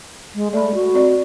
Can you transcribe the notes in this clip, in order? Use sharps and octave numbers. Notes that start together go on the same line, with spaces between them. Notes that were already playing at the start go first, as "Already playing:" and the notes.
G#3
A3 D5 B5
F#4
C4 D5 D#5